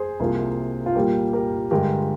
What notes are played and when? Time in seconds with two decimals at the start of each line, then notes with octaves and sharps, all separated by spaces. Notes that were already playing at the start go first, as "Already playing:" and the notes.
Already playing: G#4 C5
0.20 C2 C3 F3 A#3
0.86 F4
0.95 A#2 G3 A#3 G4
1.33 G4 A#4
1.71 G2 D3 G#3 G4 A#4